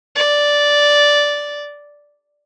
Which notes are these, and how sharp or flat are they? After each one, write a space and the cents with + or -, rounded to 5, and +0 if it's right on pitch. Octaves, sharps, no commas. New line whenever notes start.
D5 -5